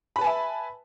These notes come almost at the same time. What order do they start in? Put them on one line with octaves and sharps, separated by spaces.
B5 B4 A5 G#5 E5